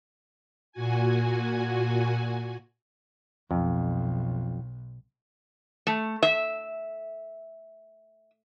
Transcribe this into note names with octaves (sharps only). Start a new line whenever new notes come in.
A#2 F#4 G#5
B1 F2
A3
E5